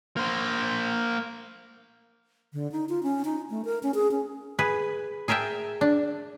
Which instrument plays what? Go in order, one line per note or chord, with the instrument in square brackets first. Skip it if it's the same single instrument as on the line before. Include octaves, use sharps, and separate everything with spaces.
[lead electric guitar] A#3 C5
[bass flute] D3
D#4
F4
C#4
D#4
A3
A#4
C#4
G#4
C#4
[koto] G#4 B4
G#4 A#4 E5 G5 A5
D4